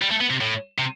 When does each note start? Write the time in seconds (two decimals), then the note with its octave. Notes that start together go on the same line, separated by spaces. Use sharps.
0.02 G3
0.11 A3
0.21 B3
0.30 C3
0.41 A2
0.78 C3